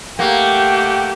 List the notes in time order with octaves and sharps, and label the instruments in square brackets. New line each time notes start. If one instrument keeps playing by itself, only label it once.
[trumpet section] A3 F#5 G5 [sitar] A#3 [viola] G4